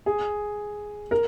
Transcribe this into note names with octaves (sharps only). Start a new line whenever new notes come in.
G#4
A#4